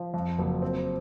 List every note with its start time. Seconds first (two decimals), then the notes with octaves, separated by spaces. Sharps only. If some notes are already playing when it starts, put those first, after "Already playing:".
Already playing: F3
0.14 F2
0.39 F#1
0.62 C4